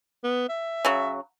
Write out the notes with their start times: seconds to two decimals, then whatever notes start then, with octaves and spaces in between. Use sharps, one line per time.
0.24 B3
0.49 E5
0.85 C#3 F#3